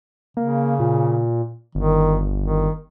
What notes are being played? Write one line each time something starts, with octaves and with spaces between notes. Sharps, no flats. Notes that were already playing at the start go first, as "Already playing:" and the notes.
C#3 A#3
A#2
G1 D#3
D#3